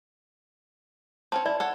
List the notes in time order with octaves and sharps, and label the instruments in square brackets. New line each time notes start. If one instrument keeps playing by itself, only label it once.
[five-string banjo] C4 C#4 C#5 [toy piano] A5
[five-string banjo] E4 [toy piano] D5
[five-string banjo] A4 C#5 F#5